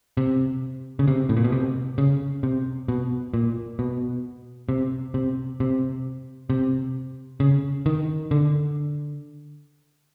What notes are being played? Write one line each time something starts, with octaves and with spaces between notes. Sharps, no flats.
C3
C#3
C3
A2
A#2
B2
C3
C#3
C3
B2
A#2
B2
C3
C3
C3
C3
C#3
D#3
D3